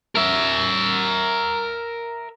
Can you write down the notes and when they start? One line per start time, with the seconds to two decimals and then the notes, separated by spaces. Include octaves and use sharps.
0.16 A#4 E5